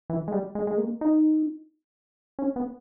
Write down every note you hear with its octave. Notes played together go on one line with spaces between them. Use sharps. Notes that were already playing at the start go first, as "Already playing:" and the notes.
E3
G#3
G3
G#3
G#3
A#3
D#4
C#4
B3